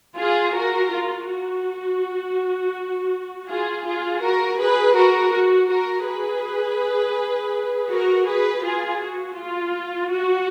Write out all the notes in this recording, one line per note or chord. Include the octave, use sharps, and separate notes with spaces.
F4 G#4
F#4 A#4
F4
F#4
F4 G#4
F4 G#4
F#4 A#4
G#4 B4
F#4 A#4
F#4
F#4 A#4
G#4 B4
F#4 A#4
G#4 B4
F4 G#4
F#4
F4
F#4